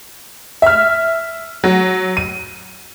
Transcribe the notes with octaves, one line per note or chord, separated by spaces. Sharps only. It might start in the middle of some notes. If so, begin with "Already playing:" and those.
E5 F6
F#3
D#7